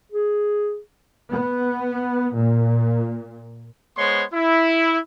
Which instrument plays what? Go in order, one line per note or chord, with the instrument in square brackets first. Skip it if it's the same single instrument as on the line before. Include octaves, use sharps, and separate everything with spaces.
[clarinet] G#4
[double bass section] B3
A#2
[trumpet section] G#3 B3 C5 C#5 C6 C#6
E4